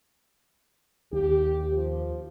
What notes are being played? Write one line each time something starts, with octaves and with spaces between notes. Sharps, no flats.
D#2 G4
F3